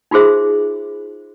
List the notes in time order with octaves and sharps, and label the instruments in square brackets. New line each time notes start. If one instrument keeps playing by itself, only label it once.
[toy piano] D#4 F4 F#4 G#4 C5 E5